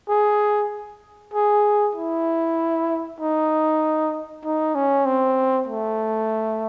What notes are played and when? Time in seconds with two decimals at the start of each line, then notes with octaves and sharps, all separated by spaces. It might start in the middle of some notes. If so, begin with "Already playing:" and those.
0.09 G#4
1.34 G#4
1.95 E4
3.20 D#4
4.44 D#4
4.75 C#4
5.06 C4
5.68 A3